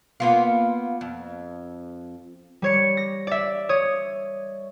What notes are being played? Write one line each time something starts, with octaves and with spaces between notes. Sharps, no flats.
A#3 B3 F4
F2
G3 C#5 C#7
A#6
D5 E5
C#5 D#6